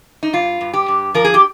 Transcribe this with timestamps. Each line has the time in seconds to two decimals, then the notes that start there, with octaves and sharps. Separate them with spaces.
0.23 D#4
0.33 G2 F4
0.61 G2
0.73 G4
0.88 G2
1.14 F3 A#4
1.24 G#4
1.34 G4